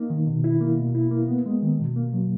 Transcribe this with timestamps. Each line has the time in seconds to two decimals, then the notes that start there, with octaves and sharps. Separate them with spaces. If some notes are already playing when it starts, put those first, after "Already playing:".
Already playing: A#3 D#4
0.10 D#3
0.27 B2
0.44 E4
0.61 A#3
0.77 B2
0.95 E4
1.11 A#3
1.28 B3
1.46 G#3
1.62 D#3
1.79 B2
1.96 A#3
2.13 F#3